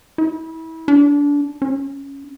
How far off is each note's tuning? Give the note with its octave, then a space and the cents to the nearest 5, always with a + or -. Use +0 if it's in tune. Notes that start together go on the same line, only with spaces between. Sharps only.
E4 -30
D4 -25
C#4 +0